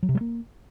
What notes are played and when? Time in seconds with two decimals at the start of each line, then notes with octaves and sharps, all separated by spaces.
0.03 F#3
0.09 C3
0.15 G3
0.21 A#3